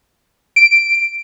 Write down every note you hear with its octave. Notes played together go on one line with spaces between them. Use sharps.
D7